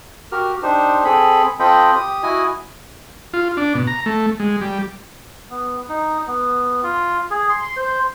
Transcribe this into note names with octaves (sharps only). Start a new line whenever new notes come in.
F#4 G4 A#4 F6
D4 D#4 G4 C5
C4 G#4 A4 B5
C4 F4 A4 D#5 G5 B5
G4 D#6
E4 F#4 D#5 G#5
F4
D4
B2
A#5
A3
G#3
G3
B3
D#4
B3
F4
G#4
C6
C6
C5